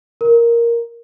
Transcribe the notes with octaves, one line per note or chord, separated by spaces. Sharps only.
A#4